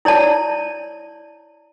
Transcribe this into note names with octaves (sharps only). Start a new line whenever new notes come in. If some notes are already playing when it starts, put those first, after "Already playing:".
E4 C#5 D5 A5